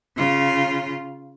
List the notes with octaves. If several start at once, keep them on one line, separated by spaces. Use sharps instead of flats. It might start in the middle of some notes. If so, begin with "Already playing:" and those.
C#3 F4